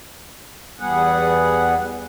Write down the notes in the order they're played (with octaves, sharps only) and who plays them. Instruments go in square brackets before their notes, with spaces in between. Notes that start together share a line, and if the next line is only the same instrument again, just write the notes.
[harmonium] E2 G3 B3 G#4 F#5